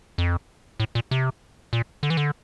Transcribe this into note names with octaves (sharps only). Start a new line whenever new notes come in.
F2
A2
A#2
C3
A#2
D3
E3
D3